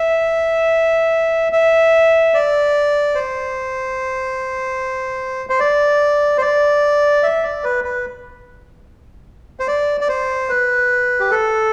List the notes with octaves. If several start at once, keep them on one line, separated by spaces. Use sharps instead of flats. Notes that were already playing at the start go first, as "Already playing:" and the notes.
Already playing: E5
E5
D5
C5
C5
D5
C5
D5
E5
D5
B4
B4
C5
D5
D5
C5
B4
G4
A4